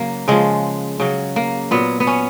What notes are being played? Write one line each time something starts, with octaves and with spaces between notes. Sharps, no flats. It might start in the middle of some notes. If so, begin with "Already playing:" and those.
Already playing: C#3 F#3 A#3
C#3 F3 G#3
C#3 F#3
A#3
A#2 F#3 B3
B3
C#4